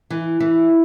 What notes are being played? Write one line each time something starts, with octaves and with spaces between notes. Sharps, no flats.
E3
E3